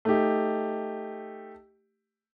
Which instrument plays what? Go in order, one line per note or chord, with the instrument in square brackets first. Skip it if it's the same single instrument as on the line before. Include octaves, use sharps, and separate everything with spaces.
[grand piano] A3 D#4 G4